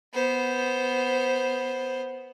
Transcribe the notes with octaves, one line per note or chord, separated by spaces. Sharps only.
B3 C5